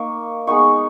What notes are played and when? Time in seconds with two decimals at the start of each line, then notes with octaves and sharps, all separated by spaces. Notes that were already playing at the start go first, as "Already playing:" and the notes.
Already playing: A#3 D#4 C#6
0.47 G#3 B3 D#4 C#6